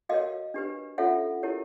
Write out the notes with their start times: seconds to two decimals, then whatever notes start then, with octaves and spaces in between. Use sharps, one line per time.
0.09 F#4 A#4 C#5 D#5 F5
0.54 D4 G4 B4
0.98 C#4 F4 A4 C#5 E5 F#5
1.43 E4 G4 A#4 C#5